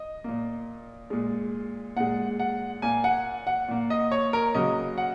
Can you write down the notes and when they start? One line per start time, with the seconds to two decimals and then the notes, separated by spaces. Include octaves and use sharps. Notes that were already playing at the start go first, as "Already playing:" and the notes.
Already playing: D#5
0.24 A#2 A#3
1.10 A#2 G#3
1.97 A#2 G#3 F#5
2.40 F#5
2.82 A#2 A#3 G#5
3.04 F#5
3.47 F#5
3.68 A#2 A#3
3.90 D#5
4.12 C#5
4.33 A#4
4.54 C#3 F#3 A#3 D#5
4.98 F#5